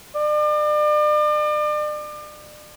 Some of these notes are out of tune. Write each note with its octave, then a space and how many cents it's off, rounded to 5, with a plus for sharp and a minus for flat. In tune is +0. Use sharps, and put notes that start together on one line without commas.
D5 +40